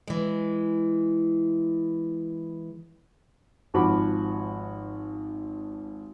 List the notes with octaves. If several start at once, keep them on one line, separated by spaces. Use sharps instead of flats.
E3 G#3
G#1 F3 F#4 B5 D6